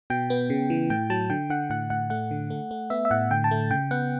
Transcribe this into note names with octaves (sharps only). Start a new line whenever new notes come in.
B2 G5
B3
C#3
E3
A2 G5
F#3 A5
D3 G5
D3 F#5
A2 F#5
A2 F#5
A3 F#5
D3
A3
A3
B3 E5
E5
A2 F#5
D3 G5
A5
A3
C#3 G5
B3 F#5